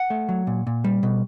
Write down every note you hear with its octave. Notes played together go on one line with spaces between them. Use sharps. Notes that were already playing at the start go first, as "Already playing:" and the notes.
Already playing: F#5
A3
F#3
A#2
A#2
G3
B2